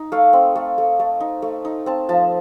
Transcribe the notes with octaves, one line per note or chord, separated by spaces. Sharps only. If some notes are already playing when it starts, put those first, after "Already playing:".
Already playing: D#4
A3 F5
C4
A3
A3
A3
D#4
A3
D#4
C4 A5
F3 A5